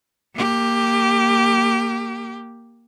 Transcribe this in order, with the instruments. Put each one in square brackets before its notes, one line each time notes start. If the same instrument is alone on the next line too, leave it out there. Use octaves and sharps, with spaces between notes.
[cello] A#3 G4